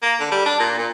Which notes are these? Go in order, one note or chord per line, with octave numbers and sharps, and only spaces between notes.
A#3
D3
G3
D4
A#2
A#2